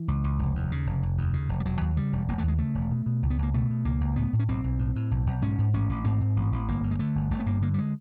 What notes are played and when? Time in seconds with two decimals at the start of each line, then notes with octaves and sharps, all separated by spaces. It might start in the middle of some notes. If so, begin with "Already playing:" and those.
Already playing: E3
0.08 C#2
0.24 C#2
0.39 F1
0.55 D#2
0.72 C#3
0.87 F1
1.03 F1
1.18 D#2
1.33 C#3
1.49 F1
1.60 G3
1.66 E1 F#3
1.81 D#2
1.96 C#3 G3
2.13 E1
2.28 E1 A#3
2.38 A3
2.43 D#2 G#3
2.58 C#3 A3
2.75 E1
2.91 B2
3.06 B2
3.23 C#2
3.30 B3
3.38 C#2 A#3
3.54 B2 A3
3.70 B2
3.85 C#2 A#3
4.01 C#2
4.16 A2 B3
4.33 A2
4.39 C#4
4.49 B1 C4
4.64 B1
4.79 A2
4.96 A2
5.11 B1
5.26 B1
5.42 G#2 C#4
5.58 G#2
5.73 A1 C#4
5.89 A1
6.05 G#2 C4
6.21 G#2
6.36 A1
6.52 A1
6.68 G1 A#3
6.83 G2
6.91 G#3
6.99 D3 A3
7.15 G1
7.31 G1 A3
7.40 B3
7.46 G2 A#3
7.62 D3 A#3
7.74 G3
7.79 G#3